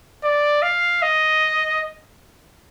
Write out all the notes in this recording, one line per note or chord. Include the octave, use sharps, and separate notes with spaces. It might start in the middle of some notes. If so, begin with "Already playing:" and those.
D5
F5
D#5